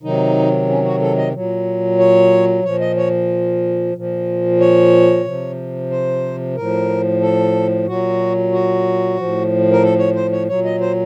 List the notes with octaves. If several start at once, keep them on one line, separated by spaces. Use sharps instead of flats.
C3 D#3 F#3 D#4
C#4
F#4
A4
D#5
A#2 F#3
C#5
A#2 F3 C#5
D#5
C#5
A#2 F3
C#5
C3 F3
C5
A2 F3 A#4
A4
A#2 F#3 F#4
F#4
A2 F3
A#4
A4
C#5
C5
C#5
A#2 F#3 C#5
D#5
C5